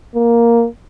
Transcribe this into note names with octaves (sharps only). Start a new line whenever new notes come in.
A#3